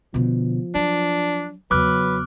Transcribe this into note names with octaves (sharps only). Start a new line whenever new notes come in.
B2 D3 F3
F#3 D4
E2 C#3 F#3 B4 D6 F6 F#6